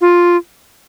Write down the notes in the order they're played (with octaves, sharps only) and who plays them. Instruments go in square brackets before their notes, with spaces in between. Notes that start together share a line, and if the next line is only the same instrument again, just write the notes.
[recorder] F4